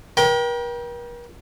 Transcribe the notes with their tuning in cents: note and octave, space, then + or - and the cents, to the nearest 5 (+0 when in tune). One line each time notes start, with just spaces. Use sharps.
A#4 +45 G5 +0